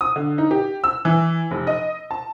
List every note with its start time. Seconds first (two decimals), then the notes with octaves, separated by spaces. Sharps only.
0.01 D#6
0.16 D3
0.38 D#4
0.51 G4
0.84 E6
1.05 E3
1.51 F1
1.67 D#5
2.11 A5